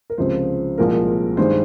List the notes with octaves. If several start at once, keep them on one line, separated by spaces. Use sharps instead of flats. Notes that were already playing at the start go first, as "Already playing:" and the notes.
A#4
C#2 C3 F3 C5
C2 A#2 F3 G#3 C4 A#4
G2 D#3 G#3 C5